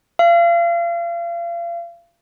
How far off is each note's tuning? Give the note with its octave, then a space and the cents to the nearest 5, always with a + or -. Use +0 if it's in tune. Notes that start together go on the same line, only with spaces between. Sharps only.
F5 -35